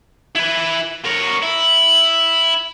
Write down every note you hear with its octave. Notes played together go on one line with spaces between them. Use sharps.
E4 B4
A#4 C#5
E4